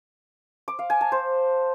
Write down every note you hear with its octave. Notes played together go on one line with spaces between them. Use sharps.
D6
F5
G#5
A5
C5